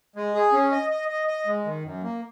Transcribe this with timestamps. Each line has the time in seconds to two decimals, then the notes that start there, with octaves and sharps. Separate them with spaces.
0.16 G#3
0.34 G#4
0.53 C#4
0.72 D#5
0.90 D#5
1.09 D#5
1.28 D#5
1.46 G#3
1.65 D#3
1.84 F#2
2.03 A#3